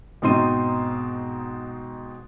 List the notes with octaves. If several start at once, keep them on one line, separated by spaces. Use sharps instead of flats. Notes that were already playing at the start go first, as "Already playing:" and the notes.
G#2 B2 C4 D#4 C6 D#7